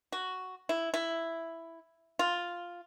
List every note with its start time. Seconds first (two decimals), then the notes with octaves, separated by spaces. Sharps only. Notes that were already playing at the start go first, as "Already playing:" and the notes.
0.12 F#4
0.69 E4
0.94 E4
2.19 F4